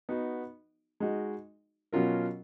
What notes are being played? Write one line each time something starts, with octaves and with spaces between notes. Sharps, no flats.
B3 D#4 F#4
G#3 D#4 F#4
B2 F#3 C#4 F4 A#4